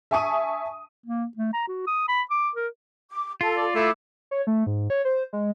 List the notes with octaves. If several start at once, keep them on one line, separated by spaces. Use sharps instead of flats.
E5 G#5 A5 C#6 D#6 D#7
A#3
A3
A#5
F#4
D#6
B5
D6
A#4
D6
F4 A4
D5
A3 E4 D6
C#5
A3
G#2
C#5
C5
G#3